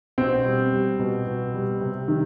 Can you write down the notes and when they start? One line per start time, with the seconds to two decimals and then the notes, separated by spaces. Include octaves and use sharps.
0.18 B2 C4
0.45 G3
0.73 G3
0.99 B2
1.27 B2
1.54 G3
1.81 C3
2.08 D#3